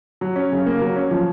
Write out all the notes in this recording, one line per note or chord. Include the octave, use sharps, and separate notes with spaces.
F#3
C#4
C#3
A#3
F#3
C#4
F3